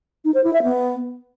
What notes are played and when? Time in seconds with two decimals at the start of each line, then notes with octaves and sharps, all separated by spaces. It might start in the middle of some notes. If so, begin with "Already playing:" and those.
0.25 D#4
0.34 C5
0.44 E4
0.53 E5
0.63 B3